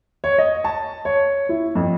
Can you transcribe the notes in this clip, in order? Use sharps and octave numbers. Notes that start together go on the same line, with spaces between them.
C#5
D#5
A5
C#5
E4
F2